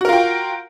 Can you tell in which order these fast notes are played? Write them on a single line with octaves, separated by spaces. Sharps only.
F#4 A#4 F4 G5